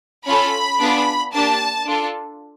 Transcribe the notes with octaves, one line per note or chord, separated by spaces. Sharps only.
C#4 F4 A4 B5
B3 D4 F4 G#4
A#3 D4 G4 A5
D4 F4 A4